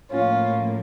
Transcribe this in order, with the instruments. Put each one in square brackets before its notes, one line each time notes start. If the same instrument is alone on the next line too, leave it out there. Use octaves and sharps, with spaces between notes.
[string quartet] A2 F3 A#3 C#4 F4